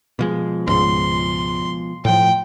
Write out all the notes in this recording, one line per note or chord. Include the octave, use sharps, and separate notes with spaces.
B2 F3 G#3
C#2 G#2 C6
A2 F3 G5